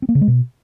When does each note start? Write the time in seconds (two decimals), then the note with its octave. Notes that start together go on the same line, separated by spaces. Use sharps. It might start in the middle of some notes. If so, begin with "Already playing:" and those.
0.02 C4
0.09 A#3
0.15 C#3
0.21 G#3
0.28 B2